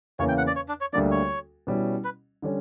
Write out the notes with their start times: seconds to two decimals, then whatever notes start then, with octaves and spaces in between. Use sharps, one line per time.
0.19 E2 C#3 E3 A#3 C#4 C#5
0.28 G5
0.38 F#5
0.47 D5
0.56 C#5
0.68 D4
0.81 C#5
0.93 D2 D3 G3 A#3 D4 D5
1.11 C#5
1.67 B2 G3 C#4 E4
2.04 B4
2.42 D3 G3 C#4